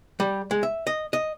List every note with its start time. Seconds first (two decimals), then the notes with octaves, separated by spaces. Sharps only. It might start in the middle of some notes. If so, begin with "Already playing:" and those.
0.20 G3
0.51 G#3
0.63 E5
0.87 D#5
1.13 D#5